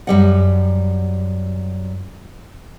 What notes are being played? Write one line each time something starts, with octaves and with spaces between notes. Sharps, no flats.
F#2 G3 F#5